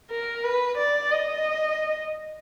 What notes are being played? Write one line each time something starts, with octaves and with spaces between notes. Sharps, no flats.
A#4
B4
D5
D#5